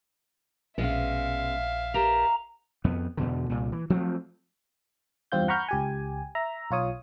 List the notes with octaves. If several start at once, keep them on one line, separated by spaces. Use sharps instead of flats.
A#1 B2 G#3 C#4 E5 F5
G4 A#4 A5 A#5
F2 B3
E2 B2 D3
C2 A#2
E3
F3 F#3 A3 C4
E2 G2 C4 F4 G6
F#5 A#5 B5 C#6 F6 G6
C#2 G4 G#5
E5 A#5
B1 F4 C#5 D#6